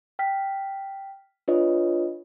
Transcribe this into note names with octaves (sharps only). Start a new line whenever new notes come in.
G5 F6 B6
D4 F4 B4 C#5 D#5